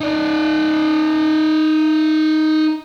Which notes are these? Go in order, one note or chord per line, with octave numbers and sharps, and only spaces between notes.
D#4 D5